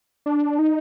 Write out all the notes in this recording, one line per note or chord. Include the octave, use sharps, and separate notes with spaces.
D4
D#4